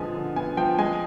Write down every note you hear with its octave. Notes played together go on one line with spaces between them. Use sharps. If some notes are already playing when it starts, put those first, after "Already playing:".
Already playing: D3 F3 G#3 B3 G#5
D3
B3 G#5
F3 G5
G#3 G#5